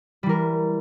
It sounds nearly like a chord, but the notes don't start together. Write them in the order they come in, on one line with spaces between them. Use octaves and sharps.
G3 E3 A#4